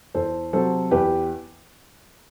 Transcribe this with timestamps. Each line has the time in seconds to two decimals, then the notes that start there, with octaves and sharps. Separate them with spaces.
0.15 E2 A4 C5
0.53 C3 F#3 A4 C5
0.91 E2 G4 B4